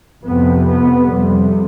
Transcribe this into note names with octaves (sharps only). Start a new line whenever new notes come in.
F2 C3 B3
B3
F2 C3 G3